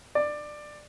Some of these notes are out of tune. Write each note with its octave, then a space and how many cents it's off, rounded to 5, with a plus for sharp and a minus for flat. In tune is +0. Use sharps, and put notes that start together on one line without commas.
D5 +15